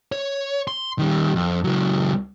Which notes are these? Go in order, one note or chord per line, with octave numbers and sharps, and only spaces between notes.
C#5
C6
D#3 G3
F2
C#2 F#3